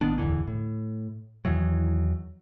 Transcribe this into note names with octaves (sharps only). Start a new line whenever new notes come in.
A1 D#3 B3 D4
D1 E2 D3 E3
A2
E2 D#3 E3 F#3